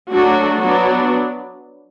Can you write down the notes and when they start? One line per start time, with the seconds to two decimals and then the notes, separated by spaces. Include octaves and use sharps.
0.11 F#3 A3 D4 F#4
0.60 F#3 B3 D4 F#4